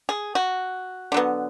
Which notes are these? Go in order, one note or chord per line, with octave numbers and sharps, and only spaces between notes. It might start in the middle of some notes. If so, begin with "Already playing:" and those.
G#4
F#4
D3 F#3 B3